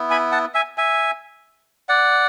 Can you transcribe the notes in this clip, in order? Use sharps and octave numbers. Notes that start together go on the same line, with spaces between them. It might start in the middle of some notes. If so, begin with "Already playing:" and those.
Already playing: B3 E4
G#5 B5
F#5 A5
E5 G#5
E5 G#5
D5 F#5